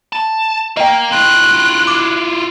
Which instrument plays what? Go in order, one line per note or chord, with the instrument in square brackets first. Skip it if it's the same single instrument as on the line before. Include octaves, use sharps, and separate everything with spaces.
[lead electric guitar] A5
[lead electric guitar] A#4 F5 [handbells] D#5 G5
[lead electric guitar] E4 F4 [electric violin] F#6
[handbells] D6